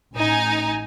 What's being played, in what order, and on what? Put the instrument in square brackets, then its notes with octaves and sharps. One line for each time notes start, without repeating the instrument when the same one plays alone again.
[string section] A1 D#4 G#5